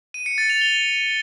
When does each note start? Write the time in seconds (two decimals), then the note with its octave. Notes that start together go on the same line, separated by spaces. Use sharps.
0.14 D#7
0.26 C#7
0.38 A6
0.50 F7
0.61 G7